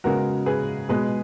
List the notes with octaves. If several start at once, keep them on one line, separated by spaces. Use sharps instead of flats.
C#3 G#3 B3 F#4 A#4
G#4 B4
B2 G#3 B3 G#4 B4